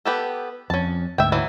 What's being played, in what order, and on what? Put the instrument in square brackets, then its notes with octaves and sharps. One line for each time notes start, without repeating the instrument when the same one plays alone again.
[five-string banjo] B3 G4 A4
[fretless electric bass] F2 [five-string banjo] C#4 A5
[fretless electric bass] D2 G#2 [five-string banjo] E5 G5
[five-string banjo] E3 F#3